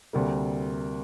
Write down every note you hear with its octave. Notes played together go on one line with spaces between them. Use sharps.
D2 C3 G3 A#3